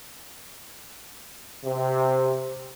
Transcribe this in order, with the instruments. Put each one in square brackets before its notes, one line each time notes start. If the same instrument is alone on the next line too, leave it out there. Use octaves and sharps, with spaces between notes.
[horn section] C3